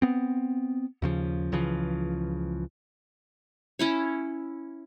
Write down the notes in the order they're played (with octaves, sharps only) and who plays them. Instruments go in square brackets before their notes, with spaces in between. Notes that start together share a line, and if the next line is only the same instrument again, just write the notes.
[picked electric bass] B3 C4
D#2 C#3 F3
C#2 C#3 E3 F3
[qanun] C#4 E4 C#5